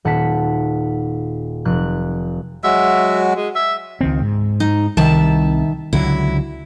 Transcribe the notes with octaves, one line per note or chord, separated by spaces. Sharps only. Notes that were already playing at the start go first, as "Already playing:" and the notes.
D#1 F#5 A5 B6
F1 F#6
F#3 G#3 F#4 E5
G#3
E5
C#2 D#3 C4
G#2
D#4
C2 D#3 E5 A5
C#2 D3 F#3 E4